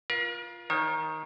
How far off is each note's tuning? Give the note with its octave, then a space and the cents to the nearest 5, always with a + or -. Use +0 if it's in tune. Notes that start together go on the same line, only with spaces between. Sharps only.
F4 +0 A#4 +40
D#3 +10 C#5 -45